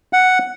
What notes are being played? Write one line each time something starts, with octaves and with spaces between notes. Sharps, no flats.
F#5